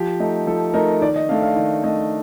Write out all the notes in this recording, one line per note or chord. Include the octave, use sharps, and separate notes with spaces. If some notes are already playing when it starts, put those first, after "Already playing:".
Already playing: F3 G4
A3 D#4
F3 A4
A3 D#4 A#4
D#3 D5
D#5
A3 D4 F5
F5
D#3 D#5
A3 D4 D#5